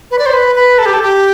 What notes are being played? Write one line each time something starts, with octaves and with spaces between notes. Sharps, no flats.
B4
D5
C5
B4
B4
A4
G4
A4
G4